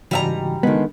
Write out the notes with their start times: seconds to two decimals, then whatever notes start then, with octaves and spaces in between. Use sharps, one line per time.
0.11 G#2 C#3 E3 G3 F#4 E5 G#5 A#5
0.63 D3 D#3 G#3 B3